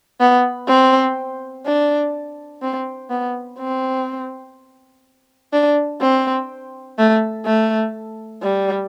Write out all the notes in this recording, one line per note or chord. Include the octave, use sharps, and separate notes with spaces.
B3
C4
D4
C4
B3
C4
D4
C4
A3
A3
G3